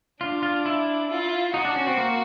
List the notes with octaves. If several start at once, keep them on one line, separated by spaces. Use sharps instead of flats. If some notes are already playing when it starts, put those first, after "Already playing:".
D4 F4
F4
E4
F4
D#4 F#4
D4
C#4
C4
A#3